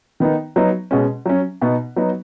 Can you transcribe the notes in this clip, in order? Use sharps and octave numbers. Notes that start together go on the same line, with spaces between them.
D#3 B3 D#4
F#3 B3 D#4
B2 G#3 C#4
F#3 C#4
B2 B3 D#4
F#3 B3 D#4